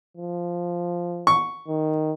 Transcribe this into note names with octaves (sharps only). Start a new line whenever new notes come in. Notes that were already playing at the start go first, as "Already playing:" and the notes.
F3
C#6
D#3